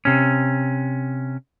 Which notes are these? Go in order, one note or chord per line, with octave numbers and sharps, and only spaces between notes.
C3 C#4